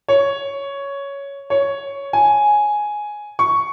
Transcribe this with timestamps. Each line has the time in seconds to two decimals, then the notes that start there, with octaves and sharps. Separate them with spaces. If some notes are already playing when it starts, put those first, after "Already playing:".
0.08 C#5
1.50 C#5
2.13 G#5
3.39 C#6